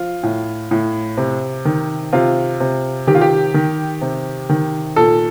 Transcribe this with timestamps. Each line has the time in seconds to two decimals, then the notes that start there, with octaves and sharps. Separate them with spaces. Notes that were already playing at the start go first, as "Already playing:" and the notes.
Already playing: F3 F4
0.23 A2
0.71 A2
1.17 C3
1.65 D#3
2.13 C3 F4
2.60 C3
3.07 D#3 G4
3.15 F4
3.21 G4
3.54 D#3
4.02 C3
4.49 D#3
4.96 A#2 A4